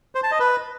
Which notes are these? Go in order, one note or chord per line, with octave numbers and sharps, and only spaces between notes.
C5
A5
D#5
B4